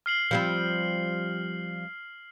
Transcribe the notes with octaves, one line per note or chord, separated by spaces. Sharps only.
F6 C7 F#7
F3 G3 C4